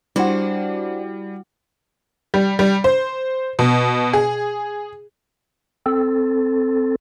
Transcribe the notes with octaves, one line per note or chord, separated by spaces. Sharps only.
G3 D4 E4 F#4 C5 F#5
G3
G3
C5
B2
G#4
C4 A4